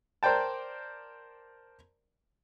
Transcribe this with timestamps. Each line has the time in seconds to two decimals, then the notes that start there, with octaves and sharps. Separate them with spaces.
0.23 A#4 C5 D5 G5 A5